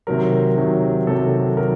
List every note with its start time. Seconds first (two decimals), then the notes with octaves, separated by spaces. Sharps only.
0.07 C3 D#3 F#3 A#4
0.57 C3 D#3 F#3
1.07 C3 D#3 F#3 A4
1.57 D#3 F#3 A#4